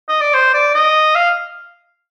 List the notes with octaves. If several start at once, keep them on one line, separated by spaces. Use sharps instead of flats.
D#5
D5
C5
D5
D#5
F5